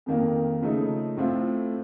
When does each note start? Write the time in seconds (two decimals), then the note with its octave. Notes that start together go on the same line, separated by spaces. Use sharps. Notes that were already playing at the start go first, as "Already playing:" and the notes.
0.06 F2 D#3 A#3
0.62 C#3 F3 A3 D#4
1.17 A2 A3 C4 F4